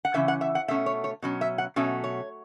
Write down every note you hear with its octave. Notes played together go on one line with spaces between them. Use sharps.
F#5
C#3 E3 C#4 E5
F#5
E5
F#5
B2 A3 C#4 E5
C#5
C#5
B2 F#3 C#4
E5
F#5
B2 F#3 A3 C#4 E5
C#5